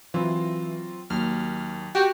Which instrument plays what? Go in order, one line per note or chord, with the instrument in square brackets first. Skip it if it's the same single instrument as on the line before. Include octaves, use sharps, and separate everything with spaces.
[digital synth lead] E3 [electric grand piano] F#3 C4 F4
[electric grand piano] D#2 F#3 [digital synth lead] F6
[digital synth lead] F#4 [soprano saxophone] G4 [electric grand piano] G6